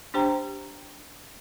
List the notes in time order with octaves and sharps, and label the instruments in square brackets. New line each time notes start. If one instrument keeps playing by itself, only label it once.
[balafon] D4 G4 C5 G5 A#5